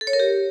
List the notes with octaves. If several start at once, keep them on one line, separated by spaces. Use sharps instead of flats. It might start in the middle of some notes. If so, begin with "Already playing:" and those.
A4
C#5
A#4
G4